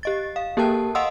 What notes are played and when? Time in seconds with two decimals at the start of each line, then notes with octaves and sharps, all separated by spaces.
0.03 G4 D#5 A6
0.36 F5
0.57 A#3 G4 A4 A#4 G5 A5
0.95 D#5 F5 F#5 C6 D#6 E6